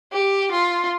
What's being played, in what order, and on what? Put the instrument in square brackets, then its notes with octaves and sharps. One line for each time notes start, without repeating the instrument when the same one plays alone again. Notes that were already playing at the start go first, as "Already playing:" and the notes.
[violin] G4
F4